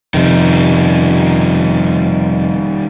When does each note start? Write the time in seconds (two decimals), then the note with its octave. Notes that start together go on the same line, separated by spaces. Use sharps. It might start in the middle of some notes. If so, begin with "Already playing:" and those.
0.14 F1 D#3 G3